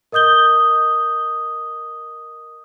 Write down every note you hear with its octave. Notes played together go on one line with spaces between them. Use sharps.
A#4 D#5 D#6 G6 G7